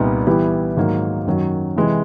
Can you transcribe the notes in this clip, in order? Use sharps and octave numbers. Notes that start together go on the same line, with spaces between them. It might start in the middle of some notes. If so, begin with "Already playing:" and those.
Already playing: C2 A#2 G3 B3 D#4
E3 G3 B3 E4 G4
G#2 D#3 F#3 A#3
F#2 D#3 F#3
C3 E3 G#3